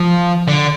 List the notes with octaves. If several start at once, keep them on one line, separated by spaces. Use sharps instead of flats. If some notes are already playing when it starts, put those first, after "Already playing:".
Already playing: F3
D3